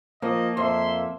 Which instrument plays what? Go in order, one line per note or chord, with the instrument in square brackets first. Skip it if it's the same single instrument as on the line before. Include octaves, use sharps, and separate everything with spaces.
[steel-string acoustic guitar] F3 [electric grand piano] A#3 [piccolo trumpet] D#5
[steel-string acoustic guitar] F2 [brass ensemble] E5 [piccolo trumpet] C6